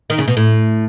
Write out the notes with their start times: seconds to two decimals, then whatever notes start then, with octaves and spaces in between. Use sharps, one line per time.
0.10 D#3
0.18 C#3
0.28 B2
0.37 A2